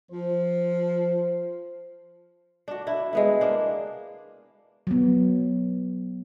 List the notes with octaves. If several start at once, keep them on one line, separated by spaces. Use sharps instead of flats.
F3 C5
D4 F#4
D4 E4
G#3 B3 E4
A#3 D4
F#3 B3